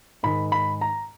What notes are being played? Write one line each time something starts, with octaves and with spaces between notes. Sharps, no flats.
G#2 D#3 G#3 B5
B5
A#5